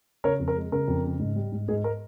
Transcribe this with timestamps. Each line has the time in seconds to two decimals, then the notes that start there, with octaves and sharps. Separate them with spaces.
0.24 C#3 A#4 C#5
0.40 F2
0.48 A#4
0.56 G#3
0.72 C#3 A#4
0.88 F2
1.04 C#3
1.19 G#2
1.36 G3
1.52 G#2
1.68 G#2 G#4
1.84 A#4